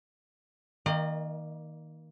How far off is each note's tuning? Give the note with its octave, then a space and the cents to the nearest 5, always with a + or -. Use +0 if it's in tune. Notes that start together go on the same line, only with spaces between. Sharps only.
D#3 +20 A#3 +0 D#5 -45